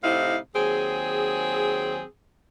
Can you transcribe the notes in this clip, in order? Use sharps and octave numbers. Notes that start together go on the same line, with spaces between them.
A2 C3 D#4 E4 F5
D#2 F#3 C4 G#4